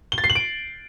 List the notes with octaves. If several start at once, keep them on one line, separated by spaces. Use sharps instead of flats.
G7
A6
C7
F#7
D7